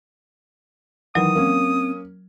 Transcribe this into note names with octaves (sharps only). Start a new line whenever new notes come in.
D#3 E3 F#3 D#6
A#3 C4 C#4